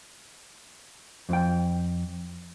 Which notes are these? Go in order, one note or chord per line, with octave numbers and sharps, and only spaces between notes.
F2 G5